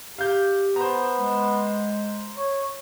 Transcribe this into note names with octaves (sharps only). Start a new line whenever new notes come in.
G4 F5 G6
B3 C5 A#5
G#3
C#5